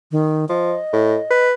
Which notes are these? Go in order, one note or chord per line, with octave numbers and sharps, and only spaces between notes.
D#3
F3 D#5
A2
B4